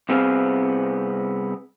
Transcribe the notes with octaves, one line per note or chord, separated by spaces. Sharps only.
C2 B3 C4 G#4 F5